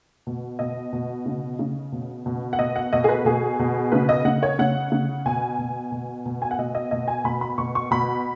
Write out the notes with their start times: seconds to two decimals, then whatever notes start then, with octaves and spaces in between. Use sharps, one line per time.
0.27 B2
0.59 B2 D#5
0.93 B2
1.26 C#3
1.59 C#3
1.92 B2
2.26 B2
2.53 F#5
2.59 B2 D#5
2.76 F#5
2.93 B2 D#5
3.04 G#4
3.09 B4
3.25 B2 G#4
3.59 B2
3.92 C#3 B4
4.09 D#5
4.25 C#3 F#5
4.43 C#5
4.59 C#3 F#5
4.92 C#3
5.26 B2 G#5
5.59 B2
5.92 B2
6.26 B2
6.42 G#5
6.51 F#5
6.59 B2 D#5
6.75 D#5
6.91 B2 D#5
7.08 G#5
7.24 B2 B5
7.41 B5
7.58 B2 C#6
7.75 C#6
7.91 B2 B5